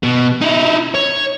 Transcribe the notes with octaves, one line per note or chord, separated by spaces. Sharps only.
B2
D#4 E4
C#5